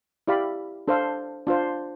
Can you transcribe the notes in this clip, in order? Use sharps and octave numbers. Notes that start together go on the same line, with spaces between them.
E4 G4 D5 F5 B5
D4 A4 C5 F5
D4 F4 C5